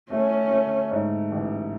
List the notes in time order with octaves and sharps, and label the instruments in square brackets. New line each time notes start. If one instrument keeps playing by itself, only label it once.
[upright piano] A3 [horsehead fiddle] C#4
[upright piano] A3
G#2
A1